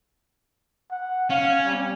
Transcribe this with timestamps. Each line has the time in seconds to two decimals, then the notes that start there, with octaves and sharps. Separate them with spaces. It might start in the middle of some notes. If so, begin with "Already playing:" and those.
0.92 F#5
1.30 C#4 F5
1.65 G3